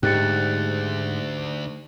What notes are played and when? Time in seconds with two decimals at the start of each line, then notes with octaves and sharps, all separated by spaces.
0.03 D2 G#2 D#4 G4 F#6 A6 C#7